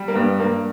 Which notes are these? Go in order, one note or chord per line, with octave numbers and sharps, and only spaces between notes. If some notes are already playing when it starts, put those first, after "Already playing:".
Already playing: G3
A#3
G2 B3
G2 A#3